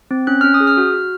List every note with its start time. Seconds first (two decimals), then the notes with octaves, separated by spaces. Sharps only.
0.11 C4
0.27 C#4 F#6
0.41 C#4 F6
0.54 D#6
0.60 G#4
0.67 F6
0.77 F#4
0.94 F#4